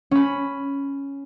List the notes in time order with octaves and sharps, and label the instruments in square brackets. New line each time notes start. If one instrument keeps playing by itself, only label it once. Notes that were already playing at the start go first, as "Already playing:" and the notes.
[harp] C#4 B5